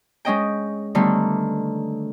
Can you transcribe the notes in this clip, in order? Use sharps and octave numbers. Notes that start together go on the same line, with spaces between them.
G#3 C#4 D#5 G5
D3 D#3 G3 A3 B3